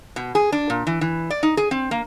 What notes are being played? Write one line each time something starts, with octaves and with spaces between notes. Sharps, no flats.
B2
G#4
D4
A#2
E3
E3
D5
D#4
G#4
C4
A#3